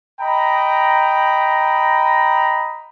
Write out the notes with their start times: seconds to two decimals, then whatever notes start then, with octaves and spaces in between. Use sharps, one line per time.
0.20 D#5 G5 A#5 B5